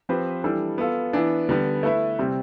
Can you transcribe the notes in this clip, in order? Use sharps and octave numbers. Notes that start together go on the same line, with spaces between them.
F3 C4 G4 B4
E3 G3 D4 A4
B3 F4 A4
E3 B3 D4
D3 G3 B3
A3 E4 B4 E5
C3 G3 C4